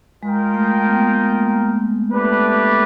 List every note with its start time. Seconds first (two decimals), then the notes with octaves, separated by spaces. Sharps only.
0.23 G#3 F4 A#4 D#5 G5
0.54 A3
0.63 G#3
0.71 A3
0.85 B3
0.97 A#3
1.08 A3
1.20 A#3
2.11 A3 D4 G4 B4